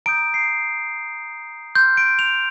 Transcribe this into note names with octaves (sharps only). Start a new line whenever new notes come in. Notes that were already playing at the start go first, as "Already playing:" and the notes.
A#5 D#6 G6 D7
C7
C6 F6 G6
D7
F7